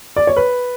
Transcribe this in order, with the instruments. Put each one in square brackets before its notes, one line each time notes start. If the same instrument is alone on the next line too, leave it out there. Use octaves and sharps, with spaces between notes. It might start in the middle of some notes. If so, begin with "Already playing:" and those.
[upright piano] D5
C#5
B4